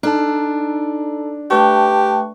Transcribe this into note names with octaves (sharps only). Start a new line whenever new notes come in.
D4 D#4 A4 A5
A3 G4 B4 G5 A5 C#6